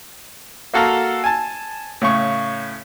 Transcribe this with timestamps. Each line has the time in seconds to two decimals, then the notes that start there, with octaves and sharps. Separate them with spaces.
0.74 A#3 F#4 A4 F5 A#5
1.24 G#5 A5
2.02 A2 C#3 C#6